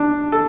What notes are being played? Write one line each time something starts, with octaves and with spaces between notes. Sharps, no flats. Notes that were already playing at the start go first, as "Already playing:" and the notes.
Already playing: D4
A4